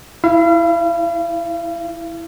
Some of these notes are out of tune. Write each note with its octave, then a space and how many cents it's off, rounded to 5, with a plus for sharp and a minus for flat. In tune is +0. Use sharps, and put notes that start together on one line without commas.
E4 +0 F5 -40